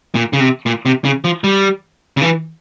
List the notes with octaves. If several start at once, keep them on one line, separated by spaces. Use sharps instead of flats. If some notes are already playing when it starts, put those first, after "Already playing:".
A#2
C#3
C3
A#2
C3
C#3
F3
G3
C#3
E3